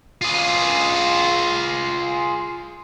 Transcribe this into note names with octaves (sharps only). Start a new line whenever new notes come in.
F4 G#4